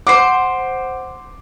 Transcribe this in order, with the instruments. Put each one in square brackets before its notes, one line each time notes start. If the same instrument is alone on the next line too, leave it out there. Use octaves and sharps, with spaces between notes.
[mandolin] C5 F#5 [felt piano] D6 C7